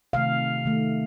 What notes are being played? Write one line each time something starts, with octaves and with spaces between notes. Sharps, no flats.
C3 D#3 A3 F5
D#3 A3